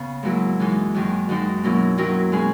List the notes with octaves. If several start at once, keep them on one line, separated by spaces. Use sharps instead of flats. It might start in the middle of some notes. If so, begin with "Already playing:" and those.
Already playing: C#3 B3
G#2 F#3 A#3 E4
F#2 E3 G#3 D#4
F#2 D#3 G#3
F#2 D#3 G#3 D#4
B2 F#3 A#3 C#4 E4
D#3 F#3 C#4 E4 A#4
B2 G#3 C#4 G#4